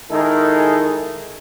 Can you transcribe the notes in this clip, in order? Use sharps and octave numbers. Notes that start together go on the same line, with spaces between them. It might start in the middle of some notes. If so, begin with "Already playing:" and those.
D#3 G#3 D#4 E4 G#4 A4